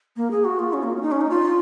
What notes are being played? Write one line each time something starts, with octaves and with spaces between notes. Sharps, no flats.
A#3
G#4
F#4
F4
C#4
A#3
C#4
D#4
C#4
D#4
F4